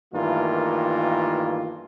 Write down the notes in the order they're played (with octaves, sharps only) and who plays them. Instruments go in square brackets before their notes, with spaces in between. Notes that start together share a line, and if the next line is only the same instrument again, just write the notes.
[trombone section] G2 D#3 E3 A3 A#3 F4